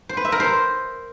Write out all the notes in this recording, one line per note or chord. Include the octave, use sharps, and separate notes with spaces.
C5
B4
E5
A#4
C5